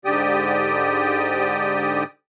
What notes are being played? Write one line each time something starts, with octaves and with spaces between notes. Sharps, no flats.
G#2 D3 G4 D5 G5 D#6